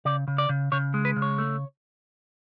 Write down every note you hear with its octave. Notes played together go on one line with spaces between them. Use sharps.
C#3 D5
C#3
D5
C#3
C#3 C#5
G#3
B4
C#3
C#5
A3